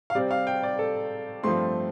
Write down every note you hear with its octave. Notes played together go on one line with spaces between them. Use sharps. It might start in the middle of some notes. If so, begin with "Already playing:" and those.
F5
C3 G3 C4 D5
F5
G5
D5
A4
G2 F3 A3 C4 C6